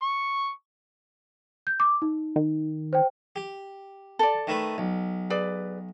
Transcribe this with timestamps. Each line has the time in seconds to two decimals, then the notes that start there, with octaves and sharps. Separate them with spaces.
0.02 C#6
1.67 G6
1.80 D6
2.02 D#4
2.36 D#3
2.93 C5 G5
3.36 G4
4.19 A4 D5
4.47 D#3 A3 B4
4.78 B1
5.30 G#4 B4 D5